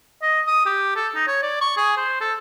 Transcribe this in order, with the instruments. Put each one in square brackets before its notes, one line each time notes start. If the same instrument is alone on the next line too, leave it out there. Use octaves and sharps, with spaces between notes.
[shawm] D#5
D#6
G4
A4
D#4
C#5
D5
C#6
G#4
C5
A4